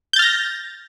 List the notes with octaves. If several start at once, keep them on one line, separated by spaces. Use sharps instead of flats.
F6 G6 A6 A#6